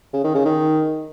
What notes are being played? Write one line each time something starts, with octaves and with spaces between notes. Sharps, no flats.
C#3
D#3
C#3
D#3